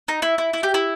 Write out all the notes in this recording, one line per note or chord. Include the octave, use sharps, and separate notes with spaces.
D#4
E4
E4
E4
G4
E4